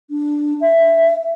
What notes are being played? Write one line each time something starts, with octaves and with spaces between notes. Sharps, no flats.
D4
E5